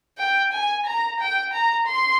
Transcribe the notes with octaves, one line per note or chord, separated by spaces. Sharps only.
G5
G#5
A#5
G5
A#5
C6